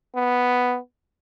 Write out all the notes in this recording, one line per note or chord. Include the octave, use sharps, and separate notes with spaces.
B3